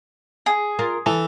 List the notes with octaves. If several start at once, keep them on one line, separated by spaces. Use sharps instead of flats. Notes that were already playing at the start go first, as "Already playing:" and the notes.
G#4
F4 A#4
E3 A4